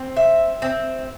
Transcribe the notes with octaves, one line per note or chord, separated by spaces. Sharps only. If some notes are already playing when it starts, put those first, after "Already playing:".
Already playing: C4
E5
C4